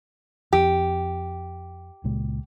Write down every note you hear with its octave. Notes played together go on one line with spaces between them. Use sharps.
F2 G4
C#2 A#2 G#3